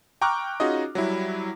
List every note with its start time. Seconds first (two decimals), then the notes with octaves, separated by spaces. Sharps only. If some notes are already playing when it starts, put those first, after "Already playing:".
0.22 G5 A#5 C#6 D6 F6 F#6
0.60 C#4 D#4 F4 F#4 G#4 D#5
0.95 F#3 G3 E4